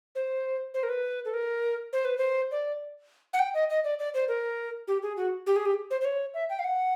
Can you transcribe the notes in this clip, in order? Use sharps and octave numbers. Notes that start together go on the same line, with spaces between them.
C5
C5
A#4
B4
A4
A#4
C5
B4
C5
D5
F#5
G5
D#5
D#5
D5
D5
C5
A#4
G4
G#4
F#4
G4
G#4
G4
C5
C5
C#5
E5
G5
F5
F#5